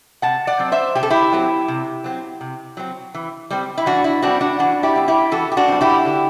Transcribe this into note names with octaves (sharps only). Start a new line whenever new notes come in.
C3 F#5 A5
D5 F#5
F#3 C4
C5 E5
C3 G4
A4
E4 G4
F#3 C4
C3
F#3 C4
C3
F#3 C4
E3
G3 C4
E4
E3 D4 F#4
E4
G3 C4 D4 F#4
D4 F#4
E3 D4 F#4
E4 G4
G3 C4
E4 G4
E3 F#4 A4
G4
D4 F#4
G3 C4
E4 G4
D3